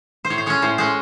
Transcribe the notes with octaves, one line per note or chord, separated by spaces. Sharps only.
C5
A2 C#5
C5
G#3 C#4 C#5
A2 C5
G#3 C#4 C5